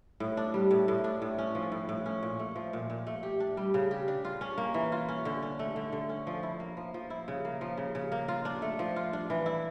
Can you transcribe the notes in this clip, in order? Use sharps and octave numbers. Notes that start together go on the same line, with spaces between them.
A2
D4
G3
A2
A2
D4
A2
C#4
F3
A2
A2
C#4
A#2
A3
F3
A#2
A#2
A3
G4
D4
G3
C#3
G4
D4
F4
C#4
A#3
E3
F4
C#4
D3
C#4
A3
D3
D3
C#4
F3
E4
A#3
F3
F3
E4
C#3
A#3
F3
C#3
C#3
A#3
F4
D4
A3
F3
F4
D4
E3
E4